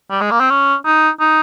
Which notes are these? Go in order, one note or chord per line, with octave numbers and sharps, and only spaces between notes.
G3
G#3
A#3
C4
C#4
D#4
D#4